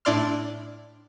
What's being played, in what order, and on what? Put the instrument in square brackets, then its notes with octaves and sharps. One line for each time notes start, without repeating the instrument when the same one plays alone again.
[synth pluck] A2 D4 E4 D5 C6 F6